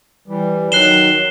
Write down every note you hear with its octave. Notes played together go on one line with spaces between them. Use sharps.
E3 G3
D#3 F#3 F#6 C7 E7 G7